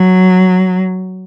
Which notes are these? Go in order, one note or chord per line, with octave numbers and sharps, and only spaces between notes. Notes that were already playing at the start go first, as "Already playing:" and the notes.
Already playing: F#3